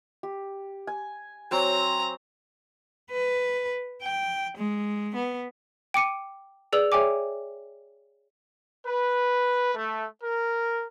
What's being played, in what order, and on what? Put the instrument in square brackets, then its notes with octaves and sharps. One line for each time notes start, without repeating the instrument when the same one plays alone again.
[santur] G4
G#5
[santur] F#3 C4 C5 [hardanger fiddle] A#5
[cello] B4
G5
G#3
B3
[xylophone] G5 D6 C#7 D#7
G#4 B4 D5 E6 F7 F#7
G#4 C#5 E5 G5 G#5 D6
[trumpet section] B4
A3
A#4